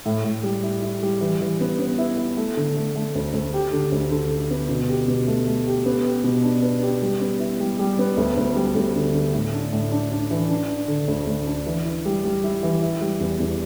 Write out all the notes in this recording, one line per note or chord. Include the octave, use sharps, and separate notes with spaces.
A2
A2
G3
E4
E4
G3
E3
E3
B3
B3
E4
E4
A3
D3
A3
A3
D2
D2
G4
D3
D2
D3
D3
B3
B2
G4
B2
A3
A3
G4
B3
G4
B2
D4
B3
G4
G3
B3
E4
G3
G3
B3
D2
D2
G3
D2
D3
D3
A2
D4
A2
D4
D4
E3
D4
D4
D3
D2
D2
D4
E3
E4
G3
G3
E4
E3
E4
G3
E2
E2